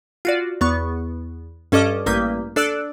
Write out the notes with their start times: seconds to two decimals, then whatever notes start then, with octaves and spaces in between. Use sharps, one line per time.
0.25 F4 F#4 D5
0.61 E2 B3 C#6
1.72 G2 C#4 A4 D#5 D6 F6
2.06 A1 G2 A#3 D#6 G6 B6
2.56 D4 A4 D5 E6 F#6 D7